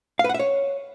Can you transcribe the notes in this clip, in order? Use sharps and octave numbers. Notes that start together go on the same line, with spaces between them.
F5
B4
F#5
E5
C#5